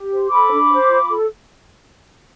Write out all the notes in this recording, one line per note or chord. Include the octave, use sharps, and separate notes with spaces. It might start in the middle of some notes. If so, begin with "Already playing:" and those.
Already playing: G4
C5
A4 B5 D6
D4
C5
F4
A4